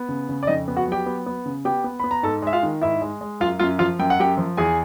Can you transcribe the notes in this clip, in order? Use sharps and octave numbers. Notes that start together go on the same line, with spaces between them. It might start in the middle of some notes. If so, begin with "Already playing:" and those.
Already playing: B3
C#3
C#3
D5
F2 D#4 D#5
B3
F#4 F#5
F#3 G4 G5
B3
B3
C#3
B3 G4 G5
B3
B3 B5
A#5
G#2 A4 A5
G#3 E5
F4 F5
D#3
G#2 E4 E5
G#3
G#3
F#2 F4 F5
F#2 F4 F5
F3 F4 F5
F#2 G5
F#5
F#2 G4 G5
F3
E2 G#4 G#5